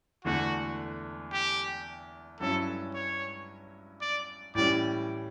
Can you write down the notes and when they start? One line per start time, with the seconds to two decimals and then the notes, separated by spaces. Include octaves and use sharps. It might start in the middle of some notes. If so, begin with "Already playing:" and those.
0.25 E2 D3 A3 F#4
1.32 G4
2.40 G2 F#3 C#4 E4 A4
2.94 C#5
4.01 D5
4.55 A2 E3 G3 C#4 D5